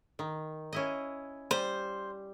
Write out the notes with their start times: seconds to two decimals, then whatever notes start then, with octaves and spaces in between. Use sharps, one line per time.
0.19 D#3
0.73 C#4 E4 D#5
1.51 G3 C5